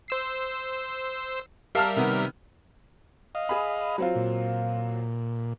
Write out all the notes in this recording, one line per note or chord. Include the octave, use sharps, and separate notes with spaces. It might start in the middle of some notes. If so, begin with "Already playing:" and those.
C5 E6 C7
G3 A#4 E5 F5 A5 F6
C3 D#3 B3
D#5 F5
G#4 B5
F#3 C4 F4
A#2